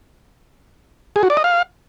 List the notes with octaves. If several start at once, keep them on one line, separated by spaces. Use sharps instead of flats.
G#4
F#4
D5
D#5
F5